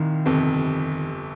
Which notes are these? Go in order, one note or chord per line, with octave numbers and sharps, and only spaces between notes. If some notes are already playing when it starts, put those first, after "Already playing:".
Already playing: C2 A#2 D#3
G1 F2 C3